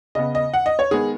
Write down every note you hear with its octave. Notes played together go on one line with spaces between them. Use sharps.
C#3 B3 D#5
D#5
F#5
D#5
C#5
D#3 G#3 B3 G#4